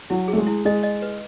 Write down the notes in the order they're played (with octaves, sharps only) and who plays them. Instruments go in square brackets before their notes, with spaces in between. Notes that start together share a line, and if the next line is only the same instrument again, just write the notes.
[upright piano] F#3 [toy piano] E4
[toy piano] G#4
[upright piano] A3
G#3
[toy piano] E4
[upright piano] G#3 [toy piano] D#5
[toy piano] D#5
B4